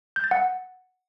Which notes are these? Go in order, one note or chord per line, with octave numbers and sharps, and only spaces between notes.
G6
A6
F#5